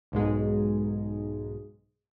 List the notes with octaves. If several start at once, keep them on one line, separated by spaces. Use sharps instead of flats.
B1 G#2 G#3